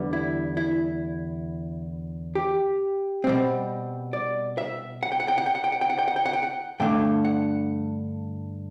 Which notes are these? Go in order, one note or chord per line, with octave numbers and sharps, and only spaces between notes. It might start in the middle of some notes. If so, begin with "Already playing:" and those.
Already playing: E2 D3 G3 B3
E4
E4
G4
B2 G3 C4
D5
E5
F#5
G5
F#5
G5
F#5
G5
F#5
G5
F#5
G5
F#5
G5
F#5
G5
F#5
G5
F#5
G2 D3 A3 D4 G5
F#5